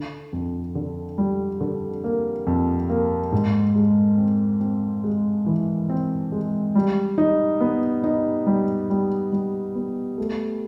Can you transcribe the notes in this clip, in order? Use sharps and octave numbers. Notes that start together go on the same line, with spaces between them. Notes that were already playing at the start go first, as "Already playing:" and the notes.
Already playing: D3
F2
D3
G3
D3
A#3
F2
A#3
G#2
G#3
C4
C4
G#3
E3
C4
G#3
G3
D#4
B3
D#4
G3
G3
G3
B3
A3